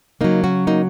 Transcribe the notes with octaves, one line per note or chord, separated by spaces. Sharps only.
C#3 F#3 A#3 D#4
C#4 F#4
A#3 D#4